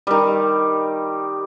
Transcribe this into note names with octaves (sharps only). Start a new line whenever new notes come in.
D#3 G3